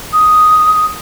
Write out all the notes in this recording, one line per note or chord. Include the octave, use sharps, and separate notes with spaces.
D#6